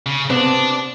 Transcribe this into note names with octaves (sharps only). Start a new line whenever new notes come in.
C#3
C3 B3 D4